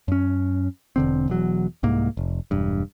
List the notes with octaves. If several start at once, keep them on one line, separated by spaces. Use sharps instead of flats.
F#2 C#4
E1 D3 C4
E1 E2 F#3
C2 G#2 A#3
F1
E1 G2